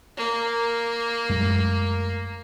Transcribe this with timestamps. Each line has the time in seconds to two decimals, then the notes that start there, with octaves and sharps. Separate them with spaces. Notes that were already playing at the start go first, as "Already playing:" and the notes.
0.17 A#3
1.29 F#2 G#3 A3